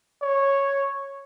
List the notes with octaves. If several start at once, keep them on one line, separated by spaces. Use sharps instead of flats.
C#5